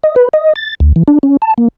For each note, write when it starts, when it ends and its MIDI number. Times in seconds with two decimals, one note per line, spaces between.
0.04 0.15 75
0.16 0.29 71
0.33 0.53 75
0.56 0.75 93
0.80 0.93 38
0.96 1.03 52
1.08 1.19 62
1.23 1.37 61
1.42 1.54 81
1.58 1.68 58